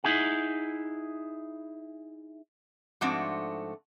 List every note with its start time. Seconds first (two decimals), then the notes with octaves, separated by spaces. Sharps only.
0.04 D#4 E4 G#4 F#5
3.01 G#2 F3 A3 C4 D4 F#4